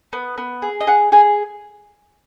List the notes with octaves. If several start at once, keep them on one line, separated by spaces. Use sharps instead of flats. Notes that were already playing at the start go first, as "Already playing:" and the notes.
B3
B3
G#4
D#5
G#4 F#5
G#4 G#5